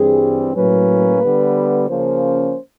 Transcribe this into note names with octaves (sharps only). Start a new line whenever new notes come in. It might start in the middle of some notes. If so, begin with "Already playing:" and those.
Already playing: G2 E3 G3 C4 G#4
A2 F#3 A#3 C#4 B4
D3 G3 B3
C#3 F3 A#3 C#4 C5